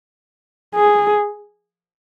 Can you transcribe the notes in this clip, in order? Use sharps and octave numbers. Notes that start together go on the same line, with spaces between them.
G#4